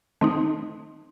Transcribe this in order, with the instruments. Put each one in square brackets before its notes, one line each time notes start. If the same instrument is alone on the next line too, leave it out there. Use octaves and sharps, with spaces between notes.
[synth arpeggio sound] D#3 A3 C4 D#4